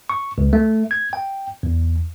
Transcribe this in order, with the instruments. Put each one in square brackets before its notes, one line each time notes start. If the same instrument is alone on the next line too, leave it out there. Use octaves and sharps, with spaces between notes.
[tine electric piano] C#6
C#2
A3
G#6
G5
E2